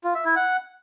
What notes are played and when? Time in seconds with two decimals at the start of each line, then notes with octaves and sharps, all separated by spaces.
0.04 F4
0.15 E5
0.25 E4
0.36 F#5